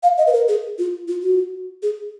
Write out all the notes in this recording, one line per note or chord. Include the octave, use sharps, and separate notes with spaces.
F5
D#5
B4
A#4
G#4
F4
F4
F#4
G#4